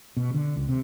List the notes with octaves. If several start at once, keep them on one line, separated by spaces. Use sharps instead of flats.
B2
D3
C#2
C3